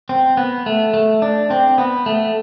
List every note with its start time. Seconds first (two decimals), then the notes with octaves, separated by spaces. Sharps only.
0.09 C4
0.37 B3
0.66 A3
0.94 A3
1.22 D4
1.50 C4
1.78 B3
2.06 A3